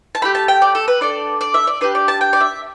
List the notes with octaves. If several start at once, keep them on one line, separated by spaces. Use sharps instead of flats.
A5
A3 E4 G4 B5
A5
G5
D5
A4
B4
D4 A4 D5
D5
E5
D5
D4 G4 B4
D5
A5
G5
D5
E5